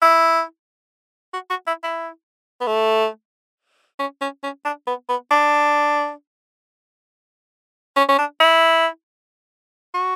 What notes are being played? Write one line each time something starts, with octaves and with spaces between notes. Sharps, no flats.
E4
F#4
F#4
E4
E4
B3
A3
C#4
C#4
C#4
D4
B3
B3
D4
C#4
C#4
D4
E4
F#4